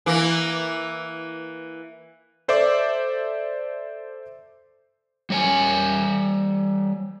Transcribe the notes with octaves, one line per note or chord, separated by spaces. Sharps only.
E3 A#3
A4 C5 D5 E5 D6
G3 C#5 G#5